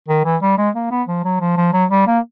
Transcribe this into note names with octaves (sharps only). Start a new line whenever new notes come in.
D#3
E3
G3
G#3
A#3
B3
F3
F#3
F3
F3
F#3
G3
A#3